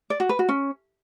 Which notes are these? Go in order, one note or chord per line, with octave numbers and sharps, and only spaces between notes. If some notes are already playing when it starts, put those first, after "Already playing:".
D5
F#4
B4
F#4
C#4